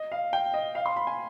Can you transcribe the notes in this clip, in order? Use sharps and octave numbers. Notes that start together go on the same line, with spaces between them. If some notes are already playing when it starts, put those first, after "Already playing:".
Already playing: D#5
F5
G5
D#5
F5
C6
B5
G#5